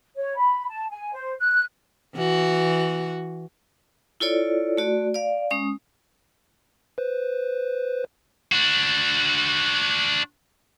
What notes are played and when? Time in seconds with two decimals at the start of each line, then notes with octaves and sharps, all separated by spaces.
0.16 C#5
0.36 B5
0.69 A5
0.89 G#5
1.13 C5
1.38 F#6
2.15 E3 F#4
4.20 E4 F4 A4 C#5 D5
4.77 A3 F#4 D5
5.14 D5 F5
5.51 G#3 C#4 D#6
6.98 B4 C5
8.52 D4 F#4